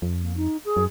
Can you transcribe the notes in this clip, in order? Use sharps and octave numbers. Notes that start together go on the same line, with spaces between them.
F2
A#3
D#4
G#4
F#2